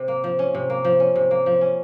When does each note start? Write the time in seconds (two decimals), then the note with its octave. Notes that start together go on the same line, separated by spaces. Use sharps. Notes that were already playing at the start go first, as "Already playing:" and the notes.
Already playing: C3
0.08 A#3
0.24 F3
0.39 C#4
0.54 C3
0.70 A#3
0.85 F3
1.00 C#4
1.16 C3
1.31 A#3
1.46 F3
1.61 C#4